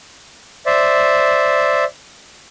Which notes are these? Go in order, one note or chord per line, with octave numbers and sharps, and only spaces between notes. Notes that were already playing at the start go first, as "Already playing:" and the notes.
C5 D5 E5